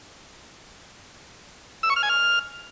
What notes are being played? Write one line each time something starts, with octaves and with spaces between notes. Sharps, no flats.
E6
C#6
F6
G#5
F6